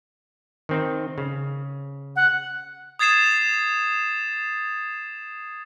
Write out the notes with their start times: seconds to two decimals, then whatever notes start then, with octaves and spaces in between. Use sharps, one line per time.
0.69 D#3 C4 D#4
1.18 C#3
2.16 F#5
2.99 D#6 G#6 A6 C7 E7